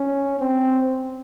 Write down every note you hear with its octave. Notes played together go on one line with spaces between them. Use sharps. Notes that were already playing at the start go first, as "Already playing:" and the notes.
Already playing: C#4
C4